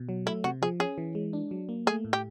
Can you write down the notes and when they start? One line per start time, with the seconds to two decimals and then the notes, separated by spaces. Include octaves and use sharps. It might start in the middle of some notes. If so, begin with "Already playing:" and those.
Already playing: B2
0.09 F#3
0.26 A3 E4
0.44 C3 F#4
0.62 F3 G#4
0.80 C#4 G#4
0.98 E3
1.15 G#3
1.33 D4
1.51 F#3
1.69 A#3
1.87 A3 G#4
2.05 A2
2.13 G4